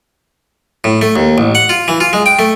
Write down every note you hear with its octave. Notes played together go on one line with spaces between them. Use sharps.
A2
A3
D#2
A1
F#5
F4
E3
F4
G#3
G5
A3